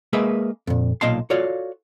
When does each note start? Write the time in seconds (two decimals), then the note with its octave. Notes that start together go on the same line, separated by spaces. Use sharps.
0.13 G#3 A#3 G#4 B4 E5
0.67 F2 A#2
1.01 B1 A#2 D#5 F5 A5 C6
1.30 F4 F#4 A4 C#5 D5 F5